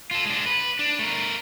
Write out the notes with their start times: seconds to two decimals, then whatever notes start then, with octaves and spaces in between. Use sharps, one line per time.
0.11 F4 A4
0.25 G#3 D4
0.46 B4
0.79 D4
0.99 A3 A#4